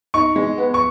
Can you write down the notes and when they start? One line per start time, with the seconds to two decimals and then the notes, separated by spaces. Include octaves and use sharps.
0.14 D#4 C#6
0.36 G#3
0.58 B3
0.74 C#6